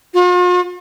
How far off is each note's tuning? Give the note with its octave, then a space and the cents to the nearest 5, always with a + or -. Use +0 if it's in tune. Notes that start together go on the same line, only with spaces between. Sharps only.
F4 +45